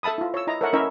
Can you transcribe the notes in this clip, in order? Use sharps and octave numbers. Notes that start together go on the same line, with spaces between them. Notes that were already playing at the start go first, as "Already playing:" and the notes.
A4 E5 A5 B5 D#6
E4 F4
C#5 E6
E4 D#5 A#5
A4 A#4 C#5 E5 F#5
C#4 E4 A#4 C#5 D#5 E5